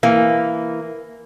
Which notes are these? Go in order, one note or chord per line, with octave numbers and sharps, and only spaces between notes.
E3 A#3